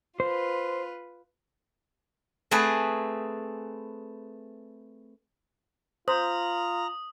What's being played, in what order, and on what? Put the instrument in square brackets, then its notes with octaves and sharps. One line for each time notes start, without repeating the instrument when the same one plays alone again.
[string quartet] F4 B4 [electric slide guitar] C5
[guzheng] A3 C4 G#4 A4 B4
[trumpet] F4 [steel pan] C5 [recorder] A#5 [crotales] D#6